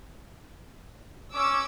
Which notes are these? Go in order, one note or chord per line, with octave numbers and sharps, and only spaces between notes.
C#4 D6 E6